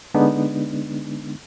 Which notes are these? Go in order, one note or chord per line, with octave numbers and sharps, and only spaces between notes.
D3 G#3 B3 D4 D#4